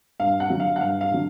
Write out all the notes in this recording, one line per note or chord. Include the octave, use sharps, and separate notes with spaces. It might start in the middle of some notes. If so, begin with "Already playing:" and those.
G2 F5
F#5
D3 F#3
F5
F#5
G2 F5
F5
D3 F#3